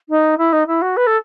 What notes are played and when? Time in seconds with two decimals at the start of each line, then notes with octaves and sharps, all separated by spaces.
0.09 D#4
0.38 E4
0.52 D#4
0.67 E4
0.82 F#4
0.97 B4
1.07 A4